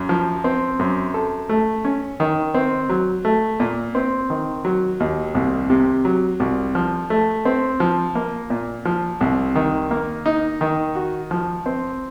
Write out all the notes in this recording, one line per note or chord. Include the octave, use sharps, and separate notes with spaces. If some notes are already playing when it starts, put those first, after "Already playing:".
Already playing: F#2
F3
C4
F#2
A4
A3
C#4
D#3
C4
F#3
A3
A#2
C4
D#3
F#3
D#2
C2
C3
F#3
C2
F3
A3
C4
F3
A#3
A#2
F3
C2
D#3
A#3
D#4
D#3
F#4
F3
C4